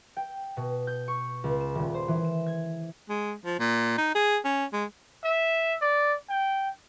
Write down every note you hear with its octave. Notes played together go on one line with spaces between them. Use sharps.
G5
B2
G6
C#6
C#2
E7
D#1
C5
E3
E7
G#6
G#3
F3
A#2
D#4
G#4
C#4
G#3
E5
D5
G5